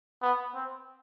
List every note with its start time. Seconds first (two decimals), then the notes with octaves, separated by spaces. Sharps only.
0.22 B3
0.55 C4